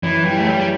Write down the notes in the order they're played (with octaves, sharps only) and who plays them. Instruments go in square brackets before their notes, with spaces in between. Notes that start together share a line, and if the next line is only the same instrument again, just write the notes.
[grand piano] F#2 [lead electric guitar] E3
[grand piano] E3 [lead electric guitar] G3
[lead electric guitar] A3
[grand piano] F#3 [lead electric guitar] G3